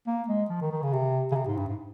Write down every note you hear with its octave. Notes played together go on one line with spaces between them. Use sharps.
A#3
G#3
F3
D#3
D#3
C#3
C3
C#3
C3
G#2
G2
G#2